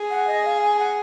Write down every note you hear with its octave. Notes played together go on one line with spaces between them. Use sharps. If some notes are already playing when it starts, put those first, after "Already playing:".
Already playing: G#4
F#5
D#5
F5
G#5
F#5